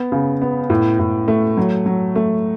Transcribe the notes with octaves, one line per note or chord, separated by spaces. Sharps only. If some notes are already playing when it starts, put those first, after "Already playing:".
Already playing: B3
C#3
B3
A2
A2
A3
F#3
F#3
A3